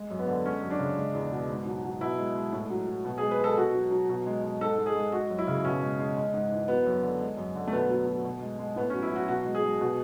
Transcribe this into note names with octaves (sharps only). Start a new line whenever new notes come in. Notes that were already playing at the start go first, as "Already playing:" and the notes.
Already playing: G#3
F#2
B3
D3
G#3 C#4
F#2
D4
C#3
G#3
E2
B2
G#2
F#3
F#3
B2 E4
G#3
G#3
A2
F#3
F#3
B2
G#4
G#3
B4
G#3 A4
B2 F#4
F#3
F#3
B2
G#3
G#3
G#2 A4
G#3
G#4
G#3
G#3 F#4
F#2
E4
C#3
B2 C#4
G#3
G#3
G#3
G#2
E3
F#3 B3
F#2
D3
G#3
F#2
D3
A3
B2 B3
F#3
F#3
B2
G#3
G#3
A2 B3
C#4
F#3
E4
F#3 F#4
B2 F#4
G#3
G#4
G#3
B2